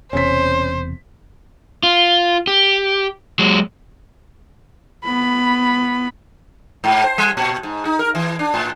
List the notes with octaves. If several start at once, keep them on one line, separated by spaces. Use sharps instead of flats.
E1 E2 C3 C#4 C5 B6
F4
G4
F#3 G#3
B3 B5
G#2
C5
G3
A#2
G#2
D#4
A#4
E3
D4
A2